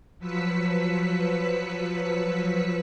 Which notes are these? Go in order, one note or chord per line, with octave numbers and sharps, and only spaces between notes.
F3 F#3 B4 E6 B6 C#7